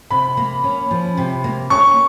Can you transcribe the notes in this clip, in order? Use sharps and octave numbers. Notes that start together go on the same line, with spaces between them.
C3 B5
A#3
C#4
F3
C3
A#3
C#4 C#6